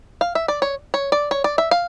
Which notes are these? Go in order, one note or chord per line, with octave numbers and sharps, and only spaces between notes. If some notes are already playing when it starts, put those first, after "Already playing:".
F5
E5
D5
C#5
C#5
D5
C#5
D5
E5
F5